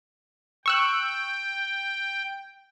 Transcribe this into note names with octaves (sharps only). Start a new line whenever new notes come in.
G5 C#6 E6 F#6